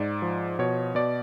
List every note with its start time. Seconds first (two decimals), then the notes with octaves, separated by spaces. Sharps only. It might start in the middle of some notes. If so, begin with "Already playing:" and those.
Already playing: G#2 D5
0.22 F3
0.59 B2 C#5
0.95 B2 D5